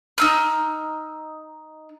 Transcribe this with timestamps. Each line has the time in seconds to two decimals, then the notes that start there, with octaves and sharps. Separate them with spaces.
0.18 D#4 E6 F6